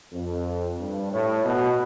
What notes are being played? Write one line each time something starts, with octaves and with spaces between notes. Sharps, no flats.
F2
G2
A2
B2